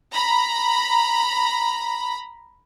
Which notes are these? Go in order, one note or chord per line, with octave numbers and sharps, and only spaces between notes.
A#5 B5